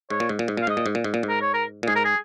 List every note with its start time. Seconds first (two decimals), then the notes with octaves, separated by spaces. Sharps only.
0.10 G#2 C#5
0.20 A#2
0.29 G#2
0.39 A#2
0.48 G#2
0.57 A#2
0.62 F5
0.67 G#2 D#5
0.77 A#2
0.86 G#2
0.95 A#2
1.04 G#2
1.14 A#2
1.23 G#2
1.29 A#4
1.41 C#5
1.53 A#4
1.83 A#2
1.87 G#2 G#4
1.96 A#4
2.04 G#4